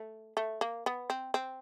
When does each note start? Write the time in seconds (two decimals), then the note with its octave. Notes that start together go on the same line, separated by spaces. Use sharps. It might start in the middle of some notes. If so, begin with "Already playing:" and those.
Already playing: A3
0.37 A3
0.61 A#3
0.86 B3
1.10 C4
1.34 C4